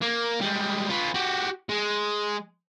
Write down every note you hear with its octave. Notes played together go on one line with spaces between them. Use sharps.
A#3
G3 G#3
F4 B4
F#4 G4
G#3